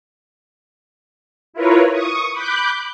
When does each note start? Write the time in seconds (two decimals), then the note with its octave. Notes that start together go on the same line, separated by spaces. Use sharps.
1.53 E4 F4 A#4 B4 C#5
1.92 C#6 D#6
2.33 B5 D6 F#6 G6